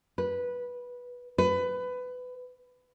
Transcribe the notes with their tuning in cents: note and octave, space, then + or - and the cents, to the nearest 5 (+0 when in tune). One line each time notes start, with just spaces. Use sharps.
B4 -10
B4 +20